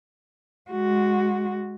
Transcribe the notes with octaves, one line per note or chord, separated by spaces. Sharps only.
G#3 F#4